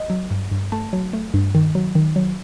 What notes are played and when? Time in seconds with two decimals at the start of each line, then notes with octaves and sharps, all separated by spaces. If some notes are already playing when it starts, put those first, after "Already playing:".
Already playing: D#5
0.10 F#3
0.31 G2
0.51 G2
0.72 A3 A5
0.93 F#3
1.13 A3
1.34 G2
1.55 D#3
1.75 F#3
1.95 D#3
2.16 F#3